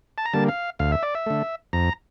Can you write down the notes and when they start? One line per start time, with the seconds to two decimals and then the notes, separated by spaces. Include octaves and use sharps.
0.18 A5
0.25 A#5
0.33 D3 G3 A#3 A5
0.48 F5
0.79 D2 F5
0.92 E5
1.03 D5
1.15 E5
1.26 D3 A3
1.73 F2 A#5